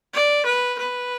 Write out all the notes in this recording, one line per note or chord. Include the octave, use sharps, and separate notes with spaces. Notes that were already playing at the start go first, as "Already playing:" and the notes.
D5
B4
B4